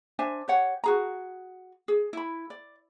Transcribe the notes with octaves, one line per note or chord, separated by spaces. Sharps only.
D4 C5 E5 G#5
G4 C#5 F#5
F#4 G#4 A#5
G#4
E4 B5
D5